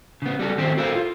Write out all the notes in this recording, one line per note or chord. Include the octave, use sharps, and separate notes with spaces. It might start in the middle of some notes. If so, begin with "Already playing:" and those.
C#3 B3
G3 F#4 A4
D#3 C4 F#4 G4 A4 C5
F#4 A4 A#4 C5 E5 F5
F4